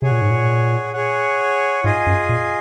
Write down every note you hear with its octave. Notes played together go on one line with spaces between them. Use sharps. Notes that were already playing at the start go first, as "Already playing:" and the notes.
C3 G#4 C#5 F#5
A#2
G#2
A#2
G#4 C#5 F#5
G#2 F4 G#4 D#5 G#5
F#2
A#2